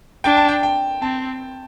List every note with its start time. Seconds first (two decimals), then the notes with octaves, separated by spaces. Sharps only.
0.24 D4 G5
0.37 A5
0.48 G5
0.63 G5
1.02 C4 A5